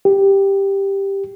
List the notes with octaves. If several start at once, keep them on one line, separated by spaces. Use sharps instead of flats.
G4